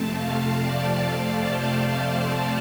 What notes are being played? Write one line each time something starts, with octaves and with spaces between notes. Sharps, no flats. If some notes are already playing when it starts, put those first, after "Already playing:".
Already playing: F2 C3 A3 C4 A5
F5
D5
D5
C5
C5
C5